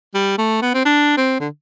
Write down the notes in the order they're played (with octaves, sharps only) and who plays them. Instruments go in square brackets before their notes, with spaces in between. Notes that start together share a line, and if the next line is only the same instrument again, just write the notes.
[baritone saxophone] G3
A3
B3
C4
D4
C4
D3